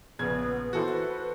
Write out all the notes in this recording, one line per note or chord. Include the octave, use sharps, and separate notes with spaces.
A#1 C#3 B3 G#6
E3 F#4 A4 C5
B4